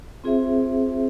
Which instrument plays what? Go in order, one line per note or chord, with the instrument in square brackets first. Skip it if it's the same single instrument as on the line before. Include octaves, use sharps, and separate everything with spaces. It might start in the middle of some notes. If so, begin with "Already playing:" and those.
[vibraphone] C4 F4 G#4 C5 E5